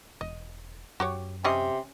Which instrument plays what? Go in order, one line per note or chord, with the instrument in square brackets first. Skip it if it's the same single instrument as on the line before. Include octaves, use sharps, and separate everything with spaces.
[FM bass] E1 [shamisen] D#5
[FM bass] F#2 [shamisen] F#4 G4 C#5
[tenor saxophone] C3 [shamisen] G3 C#4 D#5